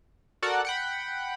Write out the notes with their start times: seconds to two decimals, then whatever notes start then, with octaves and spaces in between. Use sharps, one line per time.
0.42 F#4 A4 A#4 D5 F#5
0.65 F#5 G5 B5